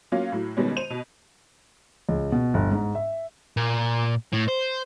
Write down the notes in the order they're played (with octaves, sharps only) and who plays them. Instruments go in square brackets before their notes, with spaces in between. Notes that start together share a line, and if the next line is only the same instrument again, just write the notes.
[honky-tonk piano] F#3 A#3 C#4 F4 F5
A2 F#3
B2 D#3 G3 G#3 B3 C#4
C5 D#7 F7
B2
[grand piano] C#2
B2
G1
G#2
E5
[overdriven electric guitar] A#2
A2
C5